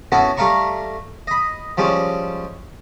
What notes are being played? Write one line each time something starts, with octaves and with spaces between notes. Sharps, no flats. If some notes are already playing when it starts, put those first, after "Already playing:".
B3 C#4 E4 F#4 A4
G3 A3 F5 A#5 C6 C#6
D#5 B5
F3 G3 G#3 C#4